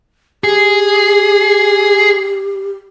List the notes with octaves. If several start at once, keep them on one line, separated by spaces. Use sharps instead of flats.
G4 G#4